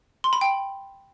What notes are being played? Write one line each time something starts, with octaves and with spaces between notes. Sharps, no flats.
C6
B5
G5